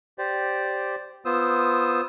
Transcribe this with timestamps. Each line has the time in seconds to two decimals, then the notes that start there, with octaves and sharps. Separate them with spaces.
0.18 G4 C5 D5
1.25 B3 F4 C5 D#6 E6